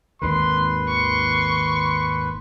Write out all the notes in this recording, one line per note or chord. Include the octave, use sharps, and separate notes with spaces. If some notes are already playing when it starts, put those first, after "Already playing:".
G#1 D#2 D#3 B4 C6
C6 C#6